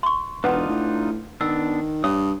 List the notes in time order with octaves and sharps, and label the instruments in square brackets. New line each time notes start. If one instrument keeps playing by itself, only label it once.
[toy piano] C6 C#6
[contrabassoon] E1 [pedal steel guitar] D4 D#4 F4 [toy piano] B4 F#5
[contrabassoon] A2
[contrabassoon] D#3 [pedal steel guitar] B3 D4 [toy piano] E6
[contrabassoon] G2 [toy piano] C#5 [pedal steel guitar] D#6